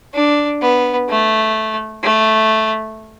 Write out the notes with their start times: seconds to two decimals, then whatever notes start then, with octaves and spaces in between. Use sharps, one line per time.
0.14 D4
0.62 B3
1.09 A3
2.03 A3